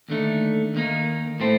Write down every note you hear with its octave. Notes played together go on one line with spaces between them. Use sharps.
D#2 D3 A3 D#4
D#2 D#3 A#3 D#4
A2 A3 C4